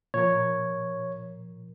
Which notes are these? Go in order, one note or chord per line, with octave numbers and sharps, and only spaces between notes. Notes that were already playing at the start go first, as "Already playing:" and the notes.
A#2 F3 A#4 C#5